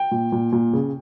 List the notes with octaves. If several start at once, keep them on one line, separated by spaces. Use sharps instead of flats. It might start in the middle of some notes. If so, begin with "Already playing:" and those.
Already playing: G5
A#2
A#2
A#2
C#3